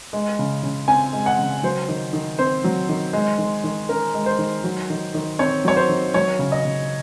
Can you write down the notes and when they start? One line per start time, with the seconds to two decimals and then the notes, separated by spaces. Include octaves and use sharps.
0.13 G#3
0.39 C#3
0.63 C#3
0.88 C4 G#5
1.13 G#3
1.26 F#5
1.39 C#3
1.63 F#3 C5
1.88 D#3
2.13 D#3
2.39 C4 C5
2.64 F#3
2.89 D#3
3.13 G#3
3.38 D#3
3.64 D#3
3.89 C#4 A#4
4.15 G#3
4.26 C5
4.39 D#3
4.64 F#3
4.90 D#3
5.14 D#3
5.39 C4 C#5
5.65 F#3 C#5
5.77 C5
5.89 D#3
6.14 F#3 C#5
6.39 C#3
6.52 D#5
6.65 C#3